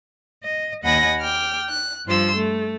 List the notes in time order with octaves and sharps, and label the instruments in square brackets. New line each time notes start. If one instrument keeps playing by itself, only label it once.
[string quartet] D#5
D#2 D#5 F#5 G#5 B5 A#6
G5 D6 F6
F#6
G2 F3 C6 E6
A3